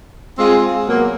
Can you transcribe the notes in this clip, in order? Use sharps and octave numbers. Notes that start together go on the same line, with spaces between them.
G#3 C4 F4 G#4
B2 F#3 A#3